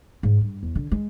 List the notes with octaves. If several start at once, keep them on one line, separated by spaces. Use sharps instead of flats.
G#2
G2
E2
D3
G#3